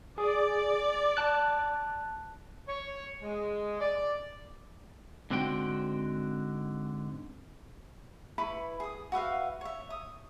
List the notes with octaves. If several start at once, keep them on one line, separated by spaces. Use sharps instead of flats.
G#4 D5
A5 F#6
C#5
G#3
D5
G#2 D3 C4 F#4 G5
E4 B4 B5 C#6
G#4 D#6
F#4 B4 E5 F5
C#5 E5
D#6